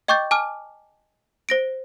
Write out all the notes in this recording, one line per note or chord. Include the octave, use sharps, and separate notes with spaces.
D#5 G5 C#6 D6 G6 A6
G#5 A5 D6 F6
C5 A#6 D7